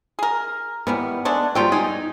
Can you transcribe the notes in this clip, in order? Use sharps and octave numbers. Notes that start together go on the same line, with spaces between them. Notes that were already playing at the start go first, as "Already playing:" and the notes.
G#4 A#4
D#3 E3 G3 B3
G#3 A3 D4
D#3 F#3 G3 C4 F4 G5
D#4 G#4